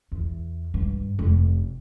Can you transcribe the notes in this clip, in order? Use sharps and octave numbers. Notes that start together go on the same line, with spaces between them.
E2
G2
F1